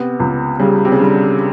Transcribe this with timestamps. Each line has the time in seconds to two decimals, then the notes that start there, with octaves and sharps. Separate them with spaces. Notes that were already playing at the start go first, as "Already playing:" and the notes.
Already playing: C3 B3
0.20 C#2
0.59 C#3 G3
0.85 C3
0.92 C#3
0.99 D3 G3